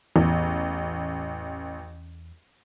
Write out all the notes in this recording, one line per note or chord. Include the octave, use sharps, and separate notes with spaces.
A1 E2